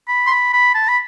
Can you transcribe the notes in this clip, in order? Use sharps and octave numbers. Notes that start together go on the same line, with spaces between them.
B5
C6
B5
B5
A5
B5